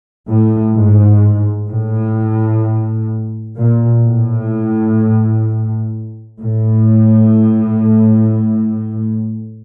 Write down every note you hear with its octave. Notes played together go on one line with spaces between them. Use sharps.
A2
G#2
A2
A#2
A2
A2